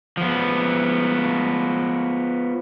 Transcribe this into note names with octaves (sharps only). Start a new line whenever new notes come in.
F3 B3